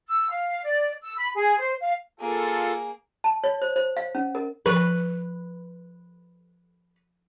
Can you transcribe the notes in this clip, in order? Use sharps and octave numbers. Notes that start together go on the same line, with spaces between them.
E6
F5
D5
E6
B5
G#4
C5
F5
A#3 F4 G#4 A4
A5
C#5
C5
C5
F5
C#4
A#4
F3 B4 C#6